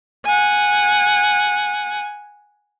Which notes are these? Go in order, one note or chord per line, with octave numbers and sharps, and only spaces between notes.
F#5 G#5